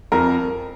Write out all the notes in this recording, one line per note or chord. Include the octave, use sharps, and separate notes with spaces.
F2 A#4